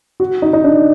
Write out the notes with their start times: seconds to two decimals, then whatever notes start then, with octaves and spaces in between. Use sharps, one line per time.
0.20 F#4
0.42 D#4
0.53 D#4
0.64 D4